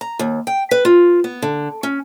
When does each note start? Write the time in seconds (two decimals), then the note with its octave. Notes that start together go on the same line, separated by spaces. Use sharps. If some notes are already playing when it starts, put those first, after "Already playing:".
0.01 A#5
0.19 D#2
0.47 G5
0.71 B4
0.85 F4
1.24 B3
1.42 D3
1.83 C#4